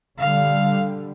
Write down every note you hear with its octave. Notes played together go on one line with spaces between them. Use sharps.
D3 G3 F5